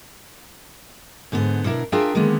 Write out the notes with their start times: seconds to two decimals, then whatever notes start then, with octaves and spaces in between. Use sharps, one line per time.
1.32 G#2 D3 B3 A4 C5
1.65 B2 D4 E4 A#4
1.92 D4 F4 G#4 A#4 E5 G5
2.15 D3 D#3 G#3 A#3 B3